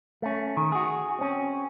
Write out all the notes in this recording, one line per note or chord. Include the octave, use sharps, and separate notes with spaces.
A3 C#4
D#3
F#4 G#4
C4 C#4